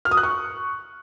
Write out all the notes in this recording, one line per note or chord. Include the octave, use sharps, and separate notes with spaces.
F6
D#6
F#6
C#6